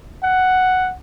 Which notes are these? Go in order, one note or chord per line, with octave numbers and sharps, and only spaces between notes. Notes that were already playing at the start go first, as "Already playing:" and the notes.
F#5